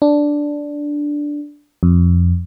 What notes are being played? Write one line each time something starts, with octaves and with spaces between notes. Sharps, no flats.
D4
F2